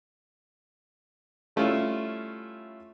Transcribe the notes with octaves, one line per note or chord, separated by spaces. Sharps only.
G3 A3 C#4 E4 F4